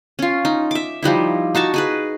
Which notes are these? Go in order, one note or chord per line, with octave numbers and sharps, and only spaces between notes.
C#4 F4
D#4
E5 D6
F3 G3 D#4 E4
D#4 F#4 A5 C#6
D#4 G#4 B4